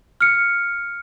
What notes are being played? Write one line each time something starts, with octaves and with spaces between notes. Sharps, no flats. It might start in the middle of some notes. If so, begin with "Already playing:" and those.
F6 C#7